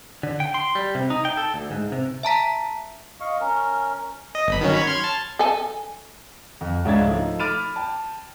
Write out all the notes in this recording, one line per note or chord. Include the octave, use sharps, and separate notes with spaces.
D3
G5
C6
G3
C3
D#4
G5
A4
D2
G#2
C3
E5 A5 A#5 B6
D#5 F5 C#6
C#4 A#4
D#5
G1 B5
D#3 F#3 C#4
C#5 B5
C6 F6 G#6
A5
A4 G#5
F2
C#2 G#2 D4 E5 G#6 A6
F3 A3 D#4
B5 D6 F6 A6 D7 D#7
G5 A5